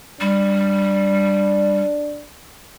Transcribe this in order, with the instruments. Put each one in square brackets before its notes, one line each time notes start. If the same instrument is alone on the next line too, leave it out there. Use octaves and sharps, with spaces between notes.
[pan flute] G3 [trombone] D4